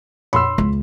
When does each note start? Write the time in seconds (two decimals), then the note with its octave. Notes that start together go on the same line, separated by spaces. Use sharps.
0.33 F2 A#2 C#5 B5 C6 E6
0.58 C#2